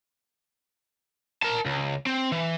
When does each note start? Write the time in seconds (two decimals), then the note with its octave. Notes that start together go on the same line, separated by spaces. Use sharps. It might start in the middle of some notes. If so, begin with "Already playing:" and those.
1.42 A#4 A5
1.66 C#2
2.06 C4
2.32 E3